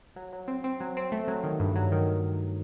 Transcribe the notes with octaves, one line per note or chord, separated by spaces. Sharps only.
F#3
F#3
C4
C4
F#3
C4
A3
F#3
D#3
G2
F#3
D#3